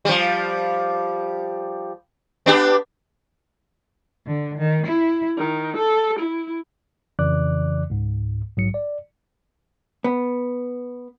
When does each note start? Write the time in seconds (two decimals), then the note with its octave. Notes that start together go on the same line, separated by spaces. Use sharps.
0.05 F3 G3
2.46 B3 D4 G4
4.27 D3
4.58 D#3
4.87 E4
5.37 D#3
5.75 A4
6.18 E4
7.19 F2 C#3 E3 D5 D6 F#6
7.90 C#2 G#2
8.57 A#1 G#2 F#3 C#7
8.74 D5
10.04 B3